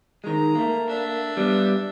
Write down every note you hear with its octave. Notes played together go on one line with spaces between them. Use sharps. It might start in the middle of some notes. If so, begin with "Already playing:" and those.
D#3 G#3 A#5
A3 A#3
D4 E5
G3 B3